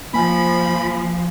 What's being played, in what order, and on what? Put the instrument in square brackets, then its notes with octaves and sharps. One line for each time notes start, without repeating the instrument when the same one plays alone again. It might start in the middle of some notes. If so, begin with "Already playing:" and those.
[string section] F3 [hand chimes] A#3 G#5 [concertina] B5